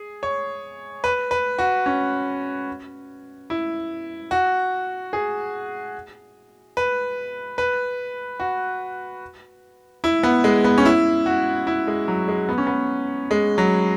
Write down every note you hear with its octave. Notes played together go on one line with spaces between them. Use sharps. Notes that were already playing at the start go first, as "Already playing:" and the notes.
Already playing: G#4
C#5
B4
B4
F#4
C#4
E4
F#4
G#4
B4
B4
F#4
E4
B3
G#3
B3
C#4
E4
F#4
E4
G#3
F#3
G#3
B3
C#4
B3
G#3
F#3